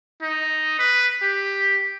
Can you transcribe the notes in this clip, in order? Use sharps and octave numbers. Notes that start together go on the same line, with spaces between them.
D#4
B4
G4